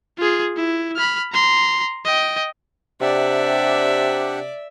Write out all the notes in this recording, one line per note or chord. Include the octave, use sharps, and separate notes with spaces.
F4 G#4
E4
B5 F6
A#5 C6
D#5 G5
C3 D4 G4 D5 E5 F#5